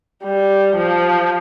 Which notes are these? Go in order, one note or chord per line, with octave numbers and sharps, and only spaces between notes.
G3
F3